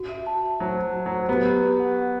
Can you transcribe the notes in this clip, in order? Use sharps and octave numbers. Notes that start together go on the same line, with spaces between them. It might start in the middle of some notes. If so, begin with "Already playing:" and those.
Already playing: F#4
E5
A5
A5
F#3 C5
C5
F#4
F#3
C5
B3 G4
G4
G4
F#5
F#5